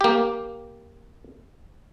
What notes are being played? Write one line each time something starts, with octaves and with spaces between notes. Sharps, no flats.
A#3 G4